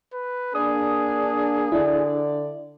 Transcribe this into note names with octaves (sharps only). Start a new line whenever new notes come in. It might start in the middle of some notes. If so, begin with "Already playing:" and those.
B4
A#3 D4 G#4 D5 D#6
D3 D4 E4 D5